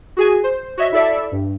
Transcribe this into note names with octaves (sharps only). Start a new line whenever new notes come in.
F#4 G#4 G#5
C5
F#4 C#5 D#5 E5
E4 A4 D5 E5
G2